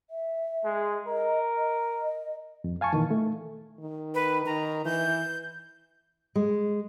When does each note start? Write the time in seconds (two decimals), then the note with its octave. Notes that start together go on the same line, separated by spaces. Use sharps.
0.10 E5
0.64 G#3
1.08 A#4 D#5
1.57 D#5
2.64 F2
2.81 F5 G#5 A5 C#6
2.93 A#2 D#3 E3
3.11 A3
3.79 D#3
4.15 B4
4.46 D#3 A#5
4.85 E3 G6
6.36 G#3